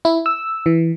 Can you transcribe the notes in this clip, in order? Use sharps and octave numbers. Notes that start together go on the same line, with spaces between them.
E4
E6
E3